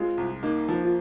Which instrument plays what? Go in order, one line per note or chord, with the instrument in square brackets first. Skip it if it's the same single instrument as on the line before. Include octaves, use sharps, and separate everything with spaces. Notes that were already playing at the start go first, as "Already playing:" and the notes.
Already playing: [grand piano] G#3 C4 [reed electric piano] F4
[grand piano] C2
[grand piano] A#3 [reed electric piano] D#4
[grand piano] F3
[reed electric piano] F4